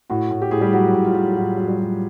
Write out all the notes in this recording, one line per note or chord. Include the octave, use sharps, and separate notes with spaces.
A2 F#4
A2
G4
A2 G#4
G3 G4
F#3 F#4
A2
F4
F#3
A2 F#4
F#3
G3 G4
F#3